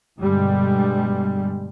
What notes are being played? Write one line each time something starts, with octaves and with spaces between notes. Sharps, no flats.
G2 B2 D3 G3 G#3